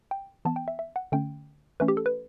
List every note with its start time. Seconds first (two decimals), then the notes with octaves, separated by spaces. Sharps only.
0.11 G5
0.45 E3 B3 A5
0.56 G5
0.68 E5
0.79 E5
0.96 F#5
1.12 D3 A3 C#4 G5
1.80 E3 A3 C#4 B4
1.88 G4
1.97 A4
2.06 B4